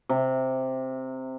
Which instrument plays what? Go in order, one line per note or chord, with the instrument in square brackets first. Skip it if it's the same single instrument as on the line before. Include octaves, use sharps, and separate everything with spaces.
[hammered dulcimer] C3